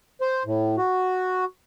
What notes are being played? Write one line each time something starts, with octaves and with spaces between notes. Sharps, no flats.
C5
A2
F#4